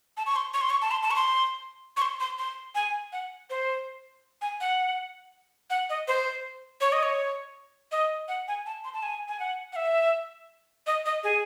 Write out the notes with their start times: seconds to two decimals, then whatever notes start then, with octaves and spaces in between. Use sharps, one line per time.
0.17 A5
0.26 C#6
0.36 C6
0.54 C#6
0.61 C6
0.70 C#6
0.82 A5
0.91 C6
1.03 A5
1.11 C#6
1.16 C6
1.97 C#6
2.02 C6
2.20 C6
2.38 C6
2.75 G#5
3.13 F#5
3.50 C5
4.42 G#5
4.61 F#5
5.70 F#5
5.90 D#5
6.08 C5
6.81 C#5
6.92 D#5
7.03 C#5
7.92 D#5
8.28 F#5
8.48 G#5
8.66 A5
8.84 C6
8.93 A5
9.03 G#5
9.28 G#5
9.40 F#5
9.73 F#5
9.76 E5
10.87 D#5
11.06 D#5
11.24 G#4